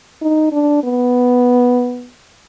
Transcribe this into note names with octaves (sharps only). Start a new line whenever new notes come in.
D#4
D4
B3